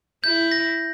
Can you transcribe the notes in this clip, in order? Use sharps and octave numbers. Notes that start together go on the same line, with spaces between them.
E4 G6
A#6